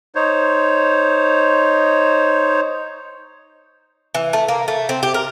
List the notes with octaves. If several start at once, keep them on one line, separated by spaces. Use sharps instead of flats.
D#4 C5 C#5
E3
A3
A#3
A3
C4
G4
A#4